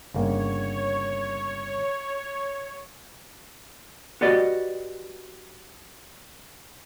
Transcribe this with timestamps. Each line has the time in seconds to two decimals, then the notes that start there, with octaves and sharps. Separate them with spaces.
0.14 G1 C#3 A#3 C#5
4.21 F#4 G4 B4 D5 D#5